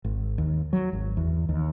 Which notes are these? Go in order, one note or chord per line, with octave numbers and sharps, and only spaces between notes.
G#1
D#2
F#3
G#1
E2
D#2